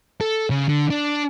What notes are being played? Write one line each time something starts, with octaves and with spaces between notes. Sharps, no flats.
A4
C#3
D3
D4